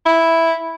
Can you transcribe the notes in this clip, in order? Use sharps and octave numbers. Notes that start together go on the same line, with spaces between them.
E4